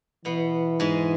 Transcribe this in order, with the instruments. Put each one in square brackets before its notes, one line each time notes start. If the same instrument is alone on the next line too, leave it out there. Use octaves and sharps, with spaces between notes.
[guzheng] B2 B3 [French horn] E3
[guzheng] G#2 G#3